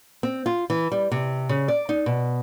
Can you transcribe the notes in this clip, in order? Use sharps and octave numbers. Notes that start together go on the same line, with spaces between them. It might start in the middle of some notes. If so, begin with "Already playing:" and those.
C4
F4
E3
G3
C3
C#3
D5
D#4
B2